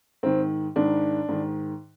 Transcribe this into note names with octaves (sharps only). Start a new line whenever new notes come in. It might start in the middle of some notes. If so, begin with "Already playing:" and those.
G#2 D#3 C4
G#2 D#3 D4
G#2 D#3